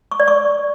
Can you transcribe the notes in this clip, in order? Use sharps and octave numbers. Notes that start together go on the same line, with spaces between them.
C#6
D5
C#6